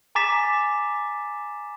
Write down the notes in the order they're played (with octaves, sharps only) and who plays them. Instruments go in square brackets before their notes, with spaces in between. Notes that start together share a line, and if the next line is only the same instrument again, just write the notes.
[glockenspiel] G#5 A#5 D6 A6 B6 E7